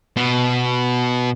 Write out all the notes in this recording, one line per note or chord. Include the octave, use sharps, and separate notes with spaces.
B2